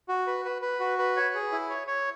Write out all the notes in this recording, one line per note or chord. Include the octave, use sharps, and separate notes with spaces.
F#4
B4
B4
B4
F#4
B4
C#5
G#4
E4
C#5
C#5